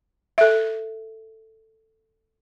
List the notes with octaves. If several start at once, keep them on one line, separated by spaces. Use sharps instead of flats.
A4 E5